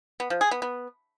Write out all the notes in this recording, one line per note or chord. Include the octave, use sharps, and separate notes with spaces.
B3
F3
G#4
B3
B3